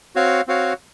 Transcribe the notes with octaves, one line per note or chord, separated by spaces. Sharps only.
C4 F#4 C#5 F5
C4 F#4 C#5 F5